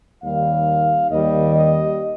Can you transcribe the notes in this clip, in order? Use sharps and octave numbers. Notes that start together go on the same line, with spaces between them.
D#2 D#3 G3 F5
D#2 D#3 G3 D#5
D#5